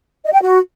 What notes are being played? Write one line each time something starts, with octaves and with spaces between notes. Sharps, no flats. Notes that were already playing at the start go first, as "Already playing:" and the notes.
D#5
G5
F#4